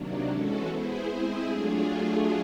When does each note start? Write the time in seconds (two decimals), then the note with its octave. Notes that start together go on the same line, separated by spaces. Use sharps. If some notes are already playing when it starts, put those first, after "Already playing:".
Already playing: C3 D#3 F#3 A#3 D4
0.27 E3 G#3 C#4 F#4 A4
0.66 B3 E4 G#4 C5
1.06 G#3 C4 E4 G#4 C5
1.44 F#3 A3 D4 F4 G#4